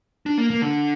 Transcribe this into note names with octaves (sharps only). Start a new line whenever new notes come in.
D4
A#3
A#3
D3